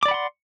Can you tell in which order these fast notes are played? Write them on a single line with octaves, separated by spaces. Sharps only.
D6 D5 B5 F#5 C6